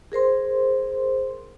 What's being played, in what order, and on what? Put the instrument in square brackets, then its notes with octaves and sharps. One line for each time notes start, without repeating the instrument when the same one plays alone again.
[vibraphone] G#4 A#4 C5 C6